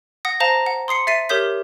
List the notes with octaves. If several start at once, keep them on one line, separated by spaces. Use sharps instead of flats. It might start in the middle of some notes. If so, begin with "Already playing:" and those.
F#5 D#6 A#6
C5 F5 A5 A#5 A#6
F#5
C6 D#6 C7 C#7
E5 A6 B6 C7 D#7
G4 A#4 C#5 D#6 G6 B6